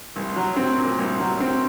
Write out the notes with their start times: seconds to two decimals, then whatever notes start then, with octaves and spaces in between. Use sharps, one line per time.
0.16 C2
0.36 F#3
0.56 C4
0.78 A#2
0.98 C2
1.20 F#3
1.40 C4